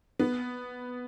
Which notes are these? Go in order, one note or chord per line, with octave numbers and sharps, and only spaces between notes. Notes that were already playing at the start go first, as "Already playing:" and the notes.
B3